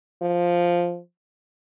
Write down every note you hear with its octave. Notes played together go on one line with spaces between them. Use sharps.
F3